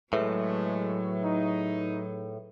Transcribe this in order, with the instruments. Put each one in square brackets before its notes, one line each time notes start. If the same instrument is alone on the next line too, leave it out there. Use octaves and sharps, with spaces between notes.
[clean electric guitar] A2 [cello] F#3 [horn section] G#3 A3 [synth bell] G#4 B4 E5
[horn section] D#4